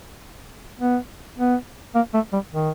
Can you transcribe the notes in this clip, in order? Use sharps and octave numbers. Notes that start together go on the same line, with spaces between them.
B3
B3
A#3
A3
G3
D#3